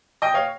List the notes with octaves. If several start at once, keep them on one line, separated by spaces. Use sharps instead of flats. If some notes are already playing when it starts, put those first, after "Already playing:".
D#5 G5
C#5 F5